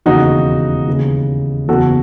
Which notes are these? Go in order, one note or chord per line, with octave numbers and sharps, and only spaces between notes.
E1 D#2 C#3 E3 D#4 F#4
D#2 C#3 E3
F#1 E2 C#3 E3 F#4 A4